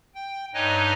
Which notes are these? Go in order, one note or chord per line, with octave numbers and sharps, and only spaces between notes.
G5
G2 D#4 B4 C#5 D#5 G#5